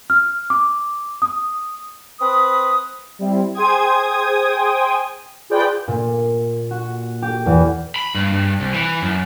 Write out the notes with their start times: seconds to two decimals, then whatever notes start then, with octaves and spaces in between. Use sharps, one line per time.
0.10 F6
0.50 D6
1.22 D#6
2.20 C4 B4 B5 D#6
3.19 G3 C4 E4
3.54 G#4 C5 G5 D#6 G#6
5.49 F4 G#4 B4 C5 D5 G5
5.88 A#2
6.71 F#4
7.22 G4
7.46 E2
7.96 B5
8.15 G2
8.33 G2
8.60 C2
8.74 E3
9.02 F#2